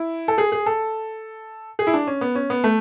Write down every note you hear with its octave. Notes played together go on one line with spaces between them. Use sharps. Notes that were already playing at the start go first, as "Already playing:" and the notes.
Already playing: E4
A4
G#4
G#4
A4
G#4
E4
D4
C#4
B3
C#4
B3
A3